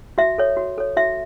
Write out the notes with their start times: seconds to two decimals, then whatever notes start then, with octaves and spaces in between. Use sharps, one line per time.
0.18 F#4 E5
0.38 A4 C#5
0.57 F#4
0.78 A4 C#5
0.97 F#4 E5